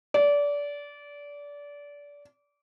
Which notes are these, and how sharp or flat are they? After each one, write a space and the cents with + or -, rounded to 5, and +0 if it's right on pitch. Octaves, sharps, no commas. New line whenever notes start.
D5 -25